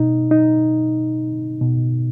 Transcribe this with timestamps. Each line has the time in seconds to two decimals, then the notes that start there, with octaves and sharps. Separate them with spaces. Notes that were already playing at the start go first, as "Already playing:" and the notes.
Already playing: B2 D#4
0.31 D#4
1.61 B2